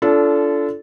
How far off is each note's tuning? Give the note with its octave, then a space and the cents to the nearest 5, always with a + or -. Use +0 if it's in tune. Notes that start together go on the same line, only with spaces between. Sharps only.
D4 -30 F4 -35 A4 -10